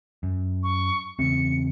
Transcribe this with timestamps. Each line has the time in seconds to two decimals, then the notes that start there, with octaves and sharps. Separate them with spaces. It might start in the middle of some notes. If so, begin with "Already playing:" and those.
0.23 F#2
0.63 C#6
1.19 E2 C#3 C4 C#7